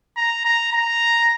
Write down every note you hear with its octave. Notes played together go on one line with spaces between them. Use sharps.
A#5
A#5
A#5